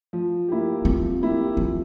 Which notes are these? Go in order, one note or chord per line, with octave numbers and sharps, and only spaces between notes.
F3
A#3 E4 G4
F3 C4
A#3 E4 G4
F3 C4